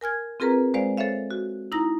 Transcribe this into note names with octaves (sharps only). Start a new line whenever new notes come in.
A#4 G#5 F6 G#6
C4 F4 G#4 A#4 B4 A#5
G#3 C5 D5 F5
A4 C5 C#5 E5 F5
F#4
D#4 E4 A#5 A#6